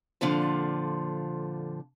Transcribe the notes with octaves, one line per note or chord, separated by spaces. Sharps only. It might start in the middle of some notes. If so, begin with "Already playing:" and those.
F2 A#2 D3 F3